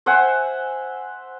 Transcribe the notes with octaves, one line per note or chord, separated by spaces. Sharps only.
C5 E5 F#5 G#5